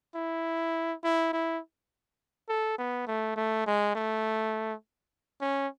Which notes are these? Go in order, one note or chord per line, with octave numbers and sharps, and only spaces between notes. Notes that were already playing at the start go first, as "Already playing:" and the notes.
E4
E4
E4
A4
B3
A3
A3
G#3
A3
C#4